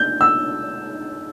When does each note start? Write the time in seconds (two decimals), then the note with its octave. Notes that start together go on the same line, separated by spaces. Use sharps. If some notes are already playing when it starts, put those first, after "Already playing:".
Already playing: G6
0.21 E6